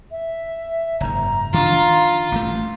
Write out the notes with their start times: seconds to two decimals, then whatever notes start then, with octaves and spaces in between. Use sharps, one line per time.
0.11 E5
1.00 F#1 G#2 A#5
1.54 D#3 D4 F4
2.32 A1 G2 A3